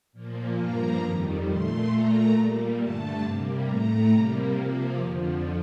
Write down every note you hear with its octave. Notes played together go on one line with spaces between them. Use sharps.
A#2 F3 A#3
G2 F3 A#3 A#5
F2 D#3 G3
A#2 A3 C6
A#2 A3 A#5
A#2 G3 A#3
G2 D3 A3 A5
C3 G3 A#3
A2 A3 A#5
C3 G3 A#3
C3 F3 A#3
F2 D3 F3